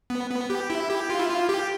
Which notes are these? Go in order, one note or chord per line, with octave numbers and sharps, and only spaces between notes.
B3
B3
G4
E4
G4
F4
E4
F4
G4